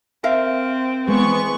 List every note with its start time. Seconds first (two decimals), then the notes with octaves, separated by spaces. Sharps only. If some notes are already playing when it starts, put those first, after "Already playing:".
0.24 C4 A#4 E5 F5
1.08 E3 G#3 B3 C#6